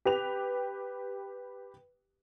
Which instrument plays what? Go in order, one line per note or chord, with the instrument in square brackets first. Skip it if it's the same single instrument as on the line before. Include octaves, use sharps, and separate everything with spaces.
[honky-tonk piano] G4 B4 F7